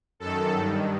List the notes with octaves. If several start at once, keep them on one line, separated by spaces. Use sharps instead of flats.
F#2 D#3 A4
G2 D#3